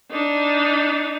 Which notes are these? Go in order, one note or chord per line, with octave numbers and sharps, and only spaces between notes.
D4 D#4